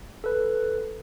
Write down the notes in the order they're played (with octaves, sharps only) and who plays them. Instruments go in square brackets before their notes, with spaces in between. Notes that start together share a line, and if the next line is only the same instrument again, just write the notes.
[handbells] A4 B4